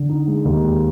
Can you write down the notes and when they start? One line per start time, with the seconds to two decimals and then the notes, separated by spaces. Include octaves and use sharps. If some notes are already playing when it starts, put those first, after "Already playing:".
Already playing: D3
0.09 D#4
0.28 G#3
0.45 D#2
0.64 G#3